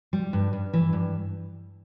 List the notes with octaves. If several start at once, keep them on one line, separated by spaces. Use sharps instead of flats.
G3
G2
G2
E3
G2